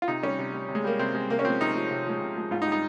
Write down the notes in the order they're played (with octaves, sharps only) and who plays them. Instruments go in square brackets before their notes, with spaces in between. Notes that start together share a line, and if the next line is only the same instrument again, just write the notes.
[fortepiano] F4
C3 D#4
G3 C#4
C3
G3
C3
G#3
G3 A#3
C3 C4
G3 G#3
C3 A#3
C#4
F3 G#3 C4
C3 D#4
F3 G#3
C3
F3 G#3
C3
F3 G#3
G#2 F4
D#4
G3
D#4